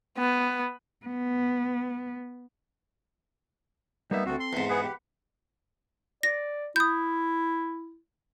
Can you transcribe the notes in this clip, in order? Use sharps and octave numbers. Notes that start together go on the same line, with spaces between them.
B3
B3
G3 A#3 B3 D#4 E5
D2 C4 F#4 A4
C6
E2 G#2
B3 G#4 B4 F#5
G4
D5 A#6
E4 D#6 G6